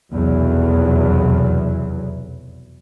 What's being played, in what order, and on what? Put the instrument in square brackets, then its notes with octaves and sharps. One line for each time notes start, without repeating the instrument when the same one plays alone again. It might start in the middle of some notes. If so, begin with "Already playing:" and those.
[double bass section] F1 B1 E2 F#3